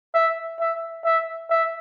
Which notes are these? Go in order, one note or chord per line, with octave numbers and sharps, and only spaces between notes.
E5
E5
E5
E5